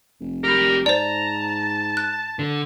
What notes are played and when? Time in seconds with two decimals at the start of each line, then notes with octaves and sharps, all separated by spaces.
0.21 F1
0.44 G4 A#4 B5
0.86 G#2 C5 D5 A5 A#5
1.97 F#6
2.39 D3